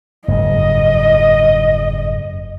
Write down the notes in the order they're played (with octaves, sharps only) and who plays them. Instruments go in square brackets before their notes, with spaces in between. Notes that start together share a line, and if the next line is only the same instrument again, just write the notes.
[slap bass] F#1 F2 G#2 [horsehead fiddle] D#5